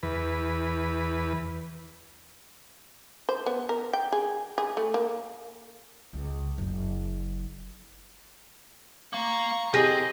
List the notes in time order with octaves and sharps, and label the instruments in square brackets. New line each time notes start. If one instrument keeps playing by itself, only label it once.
[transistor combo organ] E2 B4
[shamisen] C5
B3
A#4
G5
G#4
G#4
A3
A#3
[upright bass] C#2
F#1
[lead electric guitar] A#3 F5 [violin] A#5 C#6
[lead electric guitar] C4 [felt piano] G4 A#6 [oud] G#4 [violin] D#5